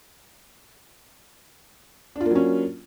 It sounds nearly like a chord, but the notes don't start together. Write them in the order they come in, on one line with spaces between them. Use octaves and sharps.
D4 F4 A#3 F#3 C#4